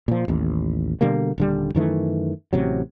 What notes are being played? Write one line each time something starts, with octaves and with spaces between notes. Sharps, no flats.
A#2 F3
A1 D#2
B2 D3 G3 A#3
D#1 D3 G3
F#2 D#3 E3 A3
A1 C3 F#3